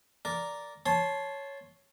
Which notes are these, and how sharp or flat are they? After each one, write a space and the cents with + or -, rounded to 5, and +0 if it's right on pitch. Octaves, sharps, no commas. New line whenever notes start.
A#4 +0 D5 -5
C#5 +0 A5 -15 C6 +0